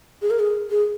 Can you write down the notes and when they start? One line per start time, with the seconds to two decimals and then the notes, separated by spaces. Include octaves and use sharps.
0.22 G#4
0.30 A#4
0.39 G#4
0.70 G#4